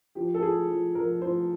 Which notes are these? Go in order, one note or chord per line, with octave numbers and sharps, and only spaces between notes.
F3 G4
A4
F3 G#4
F3
F3 A#4
F3 C5